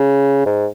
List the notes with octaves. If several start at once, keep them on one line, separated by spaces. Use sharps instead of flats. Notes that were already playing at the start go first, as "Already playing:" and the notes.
Already playing: C#3
G#2